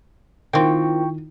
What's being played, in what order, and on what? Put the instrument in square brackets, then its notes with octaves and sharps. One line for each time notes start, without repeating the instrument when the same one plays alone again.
[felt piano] D#3 [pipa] A#3 C4 [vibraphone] E4 F4 [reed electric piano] G5 C#6